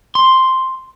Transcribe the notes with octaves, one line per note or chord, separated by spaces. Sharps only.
C6